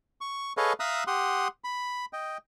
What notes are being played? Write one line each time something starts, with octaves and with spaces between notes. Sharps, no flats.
C#6
G#4 A4 B4 C#5 D#5 F5
E5 F5 A#5 D#6 E6 F#6
G4 F#5 C6 D#6
B5
D#5 G5